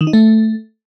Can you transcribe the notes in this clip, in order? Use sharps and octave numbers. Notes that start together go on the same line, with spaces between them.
D#3
D#4
A3